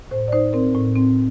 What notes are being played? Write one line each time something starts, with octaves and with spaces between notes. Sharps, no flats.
A2 C5
D5
D#4 C5
C4 A#4
A2
C4